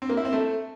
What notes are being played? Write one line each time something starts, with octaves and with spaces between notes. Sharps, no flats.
C4
A#3
E4
C4
A3